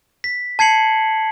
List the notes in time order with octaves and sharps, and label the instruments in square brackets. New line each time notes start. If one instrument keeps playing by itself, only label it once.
[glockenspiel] B6
A5 G#6 C7 C#7 F#7